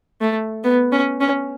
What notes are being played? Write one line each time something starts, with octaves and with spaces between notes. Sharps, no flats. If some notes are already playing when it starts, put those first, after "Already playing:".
A3
B3
C#4
C#4